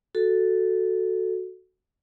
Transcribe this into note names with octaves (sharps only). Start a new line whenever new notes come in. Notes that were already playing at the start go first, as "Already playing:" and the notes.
F#4 A4